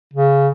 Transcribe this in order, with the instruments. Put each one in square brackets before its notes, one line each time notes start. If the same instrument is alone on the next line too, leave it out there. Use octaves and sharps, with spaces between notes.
[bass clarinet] C#3